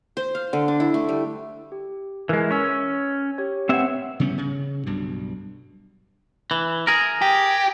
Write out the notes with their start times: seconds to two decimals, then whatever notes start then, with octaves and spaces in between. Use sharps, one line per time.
0.17 C5
0.35 F5
0.53 D3
0.68 D4
0.80 E4
0.94 A3
1.09 G3
1.72 G4
2.29 E3 G#3 A#4 B4
2.51 C#4 C#6 E6
3.38 G4 C#5
3.69 C4 B4 C#5 E5 F#5
4.20 C#3 G3 B3 C#4
4.37 C#3
4.86 B1 G2 B2
6.51 E3
6.87 G#4 A#4
7.22 G4